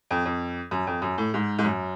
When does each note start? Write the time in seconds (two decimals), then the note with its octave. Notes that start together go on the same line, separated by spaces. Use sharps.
0.11 F2
0.26 F2
0.71 F#2
0.87 F2
1.02 F#2
1.18 A2
1.34 G#2
1.59 G#2
1.64 F#2